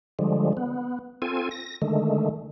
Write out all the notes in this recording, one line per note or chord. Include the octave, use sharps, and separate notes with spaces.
D3 F3 G3 G#3
B3
C4 F4 A4 G#5
A#6
D3 D#3 G#3 A3